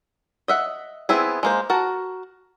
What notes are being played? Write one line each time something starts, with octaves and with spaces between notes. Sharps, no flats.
D#5 E5 F#5
B3 C4 E4 G#4
G#3 A#3 C5
F#4 A#4 A5